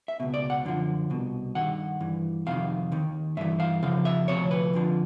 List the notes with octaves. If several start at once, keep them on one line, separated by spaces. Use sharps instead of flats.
E5
C#2 B2
D5
F#5
F#2 D3 F3
C2 B2
G2 D#3 F#5
G2 E3
F2 C3 D#3 F5
D#2 D#3
G2 E3 E5
F5
F2 C#3 F3 F5
E5
D2 C3 F3 C#5
B4
F2 D3 F3